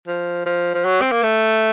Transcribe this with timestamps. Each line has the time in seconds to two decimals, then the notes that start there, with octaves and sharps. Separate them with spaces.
0.08 F3
0.46 F3
0.74 F3
0.85 F#3
1.01 C4
1.12 A#3
1.23 A3